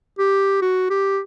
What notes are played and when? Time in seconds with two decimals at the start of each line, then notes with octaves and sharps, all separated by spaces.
0.19 G4
0.62 F#4
0.90 G4